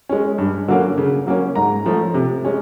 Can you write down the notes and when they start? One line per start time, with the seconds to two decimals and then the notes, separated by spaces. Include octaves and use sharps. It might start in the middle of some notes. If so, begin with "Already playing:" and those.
0.09 G#3 C#4
0.38 G2
0.68 D3 F#3 A#3 C#4
0.98 C#3
1.27 F#3 A#3 C#4
1.55 G#2 A#5
1.85 F3 A3 C#4
2.14 C3
2.45 G#3 C#4